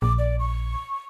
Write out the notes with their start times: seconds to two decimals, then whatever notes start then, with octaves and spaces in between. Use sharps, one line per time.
0.02 A#1 D6
0.19 D5
0.39 C#6